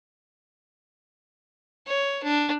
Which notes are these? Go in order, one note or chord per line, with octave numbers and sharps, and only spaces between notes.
C#5
D4